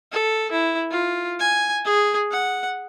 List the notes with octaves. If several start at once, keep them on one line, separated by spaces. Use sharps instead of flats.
A4
E4
F4
G#5
G#4
F#5